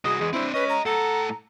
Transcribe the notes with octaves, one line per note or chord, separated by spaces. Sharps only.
C2 F#4 G#4 D#5
E2 G#3
C4 D4 E4 C5
C#4 G#4 B4 D#5
A#5
A2 A4 F#5 A#5